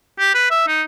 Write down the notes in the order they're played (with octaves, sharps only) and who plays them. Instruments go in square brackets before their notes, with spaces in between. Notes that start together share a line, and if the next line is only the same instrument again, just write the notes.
[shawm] G4
B4
E5
D#4